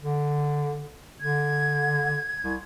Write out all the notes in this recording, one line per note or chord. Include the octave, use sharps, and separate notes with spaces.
D3
D3 G#6
C2